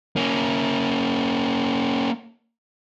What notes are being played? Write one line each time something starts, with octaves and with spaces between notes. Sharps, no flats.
A#3 C#4